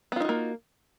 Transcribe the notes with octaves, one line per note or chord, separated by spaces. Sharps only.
A#3 B3 D#4 F4 F#4